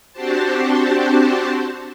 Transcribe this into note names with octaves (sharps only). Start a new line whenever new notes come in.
C4 D4 F#4 G4 C5 A5